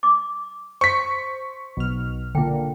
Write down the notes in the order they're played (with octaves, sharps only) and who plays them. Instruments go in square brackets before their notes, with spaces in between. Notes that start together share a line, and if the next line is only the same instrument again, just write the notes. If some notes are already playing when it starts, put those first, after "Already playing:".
[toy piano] D6
[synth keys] C5 [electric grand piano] C#6 B6
[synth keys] B1 F6
[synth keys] A#2 D3 [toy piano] G5